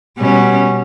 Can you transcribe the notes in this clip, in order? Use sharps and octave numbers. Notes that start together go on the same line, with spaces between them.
B2 G3 C#4